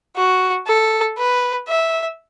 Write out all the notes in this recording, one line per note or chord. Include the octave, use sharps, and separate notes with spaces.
F#4
A4
B4
E5